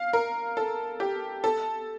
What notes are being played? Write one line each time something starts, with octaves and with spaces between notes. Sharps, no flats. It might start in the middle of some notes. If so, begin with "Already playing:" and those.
Already playing: F5
A#4
A4
G4
A4